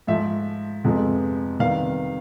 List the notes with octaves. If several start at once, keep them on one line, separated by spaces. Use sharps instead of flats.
G#2 F3 A3 E5
F2 C3 F3 G#3 B3
C3 D#3 G3 B3 F5